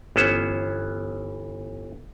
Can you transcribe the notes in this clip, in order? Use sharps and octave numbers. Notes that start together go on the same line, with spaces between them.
G1 E3 B3 C#4 C5